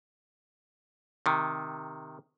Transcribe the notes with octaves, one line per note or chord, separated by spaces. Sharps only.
C3 D#3